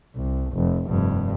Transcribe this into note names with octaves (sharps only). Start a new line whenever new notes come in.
C2
F1
F1 G2